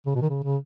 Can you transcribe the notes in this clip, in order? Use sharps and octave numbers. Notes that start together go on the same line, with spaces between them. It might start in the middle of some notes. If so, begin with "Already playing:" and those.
C#3
B2
D#3
C#3
C#3